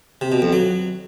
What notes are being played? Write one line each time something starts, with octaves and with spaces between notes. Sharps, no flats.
C3
B2
F2
F#3